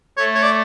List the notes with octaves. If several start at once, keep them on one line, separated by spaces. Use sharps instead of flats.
A3 C#5
C#5
D5